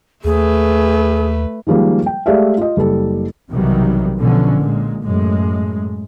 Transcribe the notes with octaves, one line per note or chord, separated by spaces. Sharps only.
D#2 A3 G#4 B4
D#3 F3 G3 G#3 A#3
G5
G#3 A3 G4 D5 E5 F5
F4 D#5
F#1 G3 A4
B1 C3 D#3 E3 F#3 G3
B2 D3 E3 F3 C#4
A#2 G#3
F#2 A2 G#3